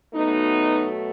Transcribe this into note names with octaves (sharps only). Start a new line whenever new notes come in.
B2 F#3 A3 B3 D#4